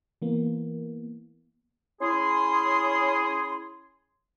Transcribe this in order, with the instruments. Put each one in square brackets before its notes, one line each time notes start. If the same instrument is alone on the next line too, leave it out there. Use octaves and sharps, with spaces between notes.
[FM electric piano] E3 A#3 B3
[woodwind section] C#4 E4 G#4 C6